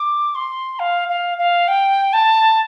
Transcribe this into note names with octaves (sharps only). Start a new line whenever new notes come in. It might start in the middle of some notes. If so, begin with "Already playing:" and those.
Already playing: D6
C6
F5
F5
F5
G5
A5